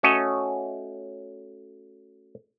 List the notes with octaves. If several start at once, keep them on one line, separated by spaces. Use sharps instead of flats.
A3 C#4 F#4 A4 C#5 D#5